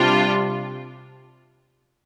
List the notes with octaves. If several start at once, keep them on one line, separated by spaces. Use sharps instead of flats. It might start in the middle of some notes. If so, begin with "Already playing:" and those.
Already playing: C3 G3 D4 F4